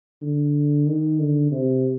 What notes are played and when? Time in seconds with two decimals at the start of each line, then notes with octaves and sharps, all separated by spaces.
0.22 D3
0.88 D#3
1.19 D3
1.52 C3